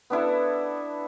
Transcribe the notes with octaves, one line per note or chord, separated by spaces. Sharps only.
B3 D4 E4 A4